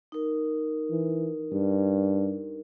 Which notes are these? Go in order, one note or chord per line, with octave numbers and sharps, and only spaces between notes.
D#4 A#4
E3
G2